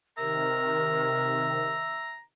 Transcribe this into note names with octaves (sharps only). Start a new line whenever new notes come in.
C3 D#3 A#4 E5 A#5